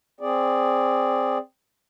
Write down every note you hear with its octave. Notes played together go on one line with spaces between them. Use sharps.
C4 G#4 D5